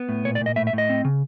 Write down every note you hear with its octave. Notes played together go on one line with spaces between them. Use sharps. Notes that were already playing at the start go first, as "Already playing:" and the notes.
Already playing: B3
A2
A#2 C#5
D5
A#2 D#5
A2 E5
E5
A2 D#5
C4
C#3